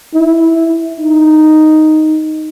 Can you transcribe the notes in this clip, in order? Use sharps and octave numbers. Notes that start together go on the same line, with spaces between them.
E4
D#4